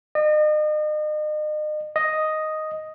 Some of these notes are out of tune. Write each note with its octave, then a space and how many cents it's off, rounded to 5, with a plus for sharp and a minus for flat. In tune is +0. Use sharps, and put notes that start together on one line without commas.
D#5 -40
D#5 +0